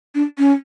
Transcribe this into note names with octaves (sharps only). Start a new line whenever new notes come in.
D4
C#4